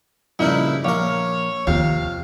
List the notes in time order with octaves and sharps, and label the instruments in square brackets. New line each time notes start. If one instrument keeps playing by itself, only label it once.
[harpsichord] G2 A#2 D#4 [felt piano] C#3 F3 [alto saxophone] E4
[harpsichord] A#1 A#4 [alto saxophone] C#5 [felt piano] F5 D6
[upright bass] D#2 [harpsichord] C3 [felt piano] F3 [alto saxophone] F5